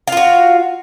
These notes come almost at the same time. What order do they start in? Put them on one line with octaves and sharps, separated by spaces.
F5 F4 F#4